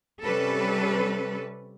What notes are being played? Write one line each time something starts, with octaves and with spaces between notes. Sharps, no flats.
C3 G3 C#4 A4 B4